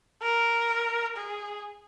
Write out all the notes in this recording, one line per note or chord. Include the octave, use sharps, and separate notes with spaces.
A#4
G#4